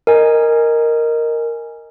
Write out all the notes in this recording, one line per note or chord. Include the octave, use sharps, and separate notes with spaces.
A#4 D#5 G#5